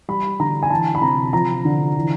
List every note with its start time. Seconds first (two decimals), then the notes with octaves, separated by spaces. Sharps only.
0.08 G3 B5
0.40 D3 A#5
0.63 G#5
0.70 E3 A5
0.95 B5
1.01 C3 A#5
1.33 F3 A#5
1.65 D3
1.96 E3